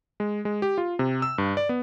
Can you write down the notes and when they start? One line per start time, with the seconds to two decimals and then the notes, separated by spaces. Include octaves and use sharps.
0.20 G#3
0.45 G#3
0.62 G4
0.78 F4
0.99 C3
1.22 E6
1.38 G2
1.57 D5
1.69 B3